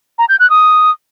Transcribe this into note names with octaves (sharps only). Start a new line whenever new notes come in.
A#5
G6
F#6
D#6